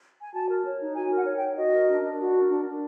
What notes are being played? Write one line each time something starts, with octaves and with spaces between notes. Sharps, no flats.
G#5
F#4 A5
A#4
C#5
D#4
F#4 G#5
A#4
F#5
C#5
G5
D#4
F#4 D#5
A#4
D4
D4
F#4
A#4
D4
D4